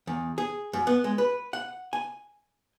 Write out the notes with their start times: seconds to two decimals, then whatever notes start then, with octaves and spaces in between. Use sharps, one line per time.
0.07 E2
0.38 G#4
0.73 F#2
0.87 B3
1.04 G#3
1.18 B4
1.53 F#5
1.93 G#5